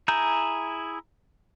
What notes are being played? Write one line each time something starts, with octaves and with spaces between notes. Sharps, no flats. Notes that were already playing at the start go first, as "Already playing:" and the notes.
E4 G#4 A#5 G6